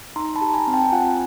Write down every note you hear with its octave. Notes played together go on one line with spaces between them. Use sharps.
D#4 A#5 C6
A5 B5
G4
G#5 A#5
C4
G5 A5
F4 F#5 G#5